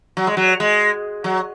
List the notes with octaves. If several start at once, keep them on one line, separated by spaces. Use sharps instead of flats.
F#3
G#3
F#3
G#3
F#3